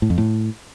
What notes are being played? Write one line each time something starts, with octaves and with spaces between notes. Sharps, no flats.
A2
F2
A2